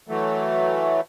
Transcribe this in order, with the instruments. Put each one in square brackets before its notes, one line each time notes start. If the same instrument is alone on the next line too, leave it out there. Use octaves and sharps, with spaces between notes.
[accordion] E3 F#3 A3